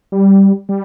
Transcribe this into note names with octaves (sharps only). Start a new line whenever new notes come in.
G3
G3